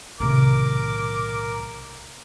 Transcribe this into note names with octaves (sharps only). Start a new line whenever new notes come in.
B1 A2 C3 D#3 A3 A#4 D6